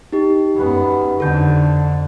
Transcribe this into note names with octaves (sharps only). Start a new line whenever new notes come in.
D#4 G4
F#2 B3
F2 D3 A4 G6